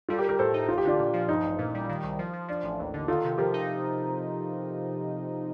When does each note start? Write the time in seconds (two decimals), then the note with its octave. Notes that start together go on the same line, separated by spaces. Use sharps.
0.09 G3 F4 A4
0.19 G4 A#4
0.23 G3
0.29 G4 A#4
0.39 A2 A4 C5
0.54 D#4
0.68 A1 F4
0.78 G4
0.85 D3 D4 F4
0.99 A#2
1.13 F3
1.29 G2 D#4
1.43 A1
1.58 A#2
1.74 G3
1.89 D#3
2.04 C2
2.19 F3
2.33 F3
2.48 F3 D4
2.63 A1
2.79 D#2
2.93 D3
3.08 D#3 F4 A4
3.24 C3
3.38 F3 G4 A#4
3.54 D#4